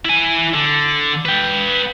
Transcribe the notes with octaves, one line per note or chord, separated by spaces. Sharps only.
E4 G#5
D3
B4 G5